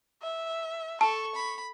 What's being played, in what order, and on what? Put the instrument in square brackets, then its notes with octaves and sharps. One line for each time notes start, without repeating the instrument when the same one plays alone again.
[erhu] E5
[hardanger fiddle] A4 [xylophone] A5 [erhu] C#6
[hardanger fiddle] B5